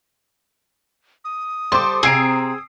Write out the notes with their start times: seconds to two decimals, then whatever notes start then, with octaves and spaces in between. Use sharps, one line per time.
1.25 D#6
1.72 G3 A4 C5 C6 D6
2.03 C3 C4 G#4 A#5 E6 C7 D7